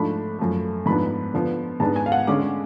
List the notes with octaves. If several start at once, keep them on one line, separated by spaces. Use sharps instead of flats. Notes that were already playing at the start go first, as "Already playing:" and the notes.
Already playing: G#2 F3 A3 D4 B5
F#2 F3 A3
G#2 F3 B3 D4 B5
D3 F3 B3
G#2 G#3 B3 D4 A5
G#5
F5
F#5
D3 G#3 C#4 D6